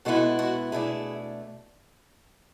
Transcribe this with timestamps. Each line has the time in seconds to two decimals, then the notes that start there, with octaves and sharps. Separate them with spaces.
0.05 B2 G#3 B3 E4 F#4 A4
0.39 F#4 A4
0.72 B2 A3 D4 E4 G#4